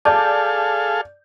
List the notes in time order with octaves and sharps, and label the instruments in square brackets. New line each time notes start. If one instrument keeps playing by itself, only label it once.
[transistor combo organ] G#4 A4 F5 [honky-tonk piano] D5 G6 [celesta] A5